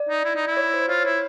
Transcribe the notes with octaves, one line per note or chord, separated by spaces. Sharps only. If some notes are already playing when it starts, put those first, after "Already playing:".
Already playing: D5
D#4
E4
D#4
E4
C#5
C5
F4 C#5
E4 C#5